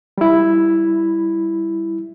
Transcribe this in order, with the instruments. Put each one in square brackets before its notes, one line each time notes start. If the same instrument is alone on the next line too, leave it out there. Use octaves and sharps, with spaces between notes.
[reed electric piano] G3 E4